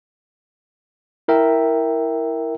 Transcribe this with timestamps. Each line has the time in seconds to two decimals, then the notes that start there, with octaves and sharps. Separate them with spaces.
1.28 E4 A#4 E5 G5